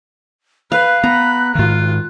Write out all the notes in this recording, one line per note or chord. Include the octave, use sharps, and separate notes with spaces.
B4 F5 F#6
B3 A#5 B5
G#2 D#3 F4